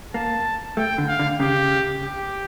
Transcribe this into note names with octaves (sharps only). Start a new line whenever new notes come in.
A#3 A5
A3 G5
D3
F5
D3
C#3 G4
G4